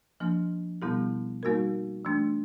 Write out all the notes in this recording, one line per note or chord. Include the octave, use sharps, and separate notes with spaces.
F3 A#3 D4
B2 G3 B3 E4 G4
G3 A#3 D#4 F#4 A#4
E3 A3 D4